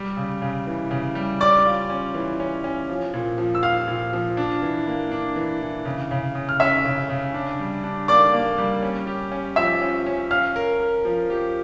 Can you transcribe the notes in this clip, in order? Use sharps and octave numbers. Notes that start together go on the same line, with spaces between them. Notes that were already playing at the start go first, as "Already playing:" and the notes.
Already playing: G3
C#3
C#3
E3
C#3
G3
C#4 D5 D6
F4
C#4
E3
C#4
C#4
F3
A#2
F3
E6
F3 F5 F6
A#2
F3
D4
E3
A#3
D4
E3
E3
C#3
C#3
C#3
F6
C#4 E5 E6
C#3
C#3
D4
G3
D4
A#3 D5 D6
A#3
G3
C#4
G4
C#4
F3 E5 E6
C#4
C#4
C#4 F5 F6
A#4
A#4
F3
G4